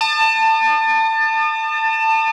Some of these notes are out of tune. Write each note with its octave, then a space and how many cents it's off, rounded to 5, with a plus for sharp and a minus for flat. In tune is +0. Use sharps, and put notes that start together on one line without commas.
A5 +20 D#6 -40